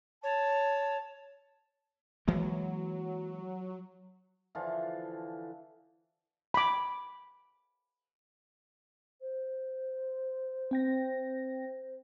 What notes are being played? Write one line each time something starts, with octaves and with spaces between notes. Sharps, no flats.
C#5 A5
E3 F#3 G#3 A#3
D3 E3 F3 F4
B5 D6
C5
C4 G5 A#6